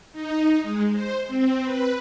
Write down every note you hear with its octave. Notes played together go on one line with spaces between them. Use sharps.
D#4
G#3
C5
C4
B4